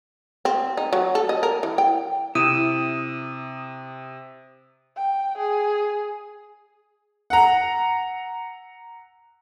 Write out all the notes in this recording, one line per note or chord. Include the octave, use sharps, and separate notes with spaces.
C4
D#4
F#3
A4
D#5
A#4
E3
G5
C3 E4 D#6 D#7 E7
G5
G#4
F#5 A#5